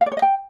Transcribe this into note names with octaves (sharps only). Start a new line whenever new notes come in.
F5
D5
C#5
D#5
G5